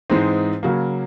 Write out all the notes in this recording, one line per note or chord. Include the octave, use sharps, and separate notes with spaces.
G#2 E3 G#3 C4 D#4
C#3 F#3 A#3